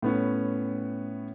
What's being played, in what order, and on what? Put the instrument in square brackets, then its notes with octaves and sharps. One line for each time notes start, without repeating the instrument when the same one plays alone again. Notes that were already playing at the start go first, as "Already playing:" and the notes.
[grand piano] A2 B3 C#4